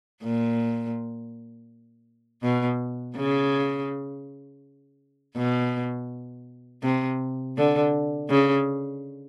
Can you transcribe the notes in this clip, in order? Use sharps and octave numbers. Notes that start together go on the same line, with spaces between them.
A#2
B2
C#3
B2
C3
D3
C#3